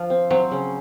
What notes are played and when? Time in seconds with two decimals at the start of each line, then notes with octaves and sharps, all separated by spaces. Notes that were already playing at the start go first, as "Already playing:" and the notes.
Already playing: F3
0.10 C4
0.30 F#3 C4
0.51 C#3